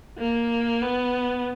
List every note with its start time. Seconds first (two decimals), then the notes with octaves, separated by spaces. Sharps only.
0.18 A#3
0.82 B3